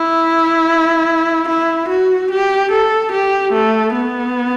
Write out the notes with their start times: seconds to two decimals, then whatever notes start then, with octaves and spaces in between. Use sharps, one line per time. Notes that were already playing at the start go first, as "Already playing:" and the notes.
Already playing: E4
1.48 E4
1.89 F#4
2.31 G4
2.71 A4
3.12 G4
3.52 A3
3.94 B3